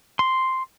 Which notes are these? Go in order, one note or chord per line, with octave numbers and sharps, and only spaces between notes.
C6